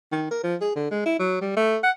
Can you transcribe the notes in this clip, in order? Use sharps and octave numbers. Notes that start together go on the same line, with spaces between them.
D#3
A#4
F3
G#4
D3
G#3
E4
F#3
G3
A3
F#5